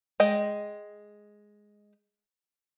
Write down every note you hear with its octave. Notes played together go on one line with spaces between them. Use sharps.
G#3 D#5 G5